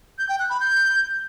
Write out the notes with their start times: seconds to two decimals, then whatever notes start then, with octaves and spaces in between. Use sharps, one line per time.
0.19 G6
0.29 G5
0.39 F#6
0.50 B5
0.60 G6